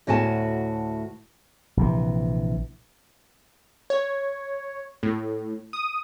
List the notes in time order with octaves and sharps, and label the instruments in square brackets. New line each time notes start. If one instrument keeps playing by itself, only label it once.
[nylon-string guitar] D2 A2 F#4 G#5 A5
[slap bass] A#1 C3 E3
[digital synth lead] C#5
A2
D#6